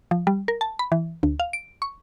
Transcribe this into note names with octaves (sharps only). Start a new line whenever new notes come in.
F3
G3
A#4
A5
B5
E3
D2
F5
D7
C#6